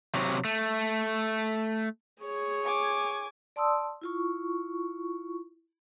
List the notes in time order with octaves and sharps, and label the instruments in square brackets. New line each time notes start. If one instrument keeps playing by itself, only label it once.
[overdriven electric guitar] C3 F#3
A3
[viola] G#4 C#5
[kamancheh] G#5 D6
[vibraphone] D5 A5 C6 D#6 E6
E4 F4 C#6